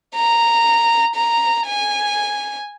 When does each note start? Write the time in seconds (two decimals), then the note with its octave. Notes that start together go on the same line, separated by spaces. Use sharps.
0.15 A#5
1.15 A#5
1.66 G#5